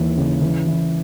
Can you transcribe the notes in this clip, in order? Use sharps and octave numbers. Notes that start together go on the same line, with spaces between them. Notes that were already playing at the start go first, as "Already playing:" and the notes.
Already playing: D#2 E3
C#3
E3
E3